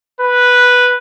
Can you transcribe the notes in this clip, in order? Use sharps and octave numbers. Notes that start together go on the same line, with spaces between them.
B4